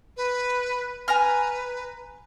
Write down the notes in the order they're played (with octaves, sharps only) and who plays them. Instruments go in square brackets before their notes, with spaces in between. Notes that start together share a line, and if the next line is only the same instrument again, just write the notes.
[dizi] B4
[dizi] B4 [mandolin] G#5 A#5 F6